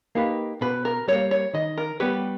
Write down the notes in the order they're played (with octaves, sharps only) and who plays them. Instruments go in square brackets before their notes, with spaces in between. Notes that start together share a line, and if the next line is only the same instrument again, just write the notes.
[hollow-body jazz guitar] A#3 D#4 G4 B4
[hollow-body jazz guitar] B2 [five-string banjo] B4
[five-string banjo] A#4
[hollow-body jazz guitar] G3 A#3 [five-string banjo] C#5
[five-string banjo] C#5
[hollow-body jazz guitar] D#3 [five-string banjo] D#5
[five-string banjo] A#4
[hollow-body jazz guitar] G3 B3 G4 C#5 [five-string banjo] B4